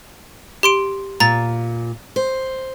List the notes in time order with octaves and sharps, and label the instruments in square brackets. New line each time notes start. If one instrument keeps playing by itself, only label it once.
[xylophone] G4 C6 D7
[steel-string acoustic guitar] A#2 [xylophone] A#5 A6
[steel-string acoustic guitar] C5